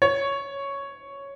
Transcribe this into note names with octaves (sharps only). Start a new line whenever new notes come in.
C#5